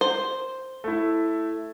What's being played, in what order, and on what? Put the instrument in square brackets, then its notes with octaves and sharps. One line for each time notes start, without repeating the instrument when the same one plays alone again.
[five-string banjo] C5
[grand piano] A3 E4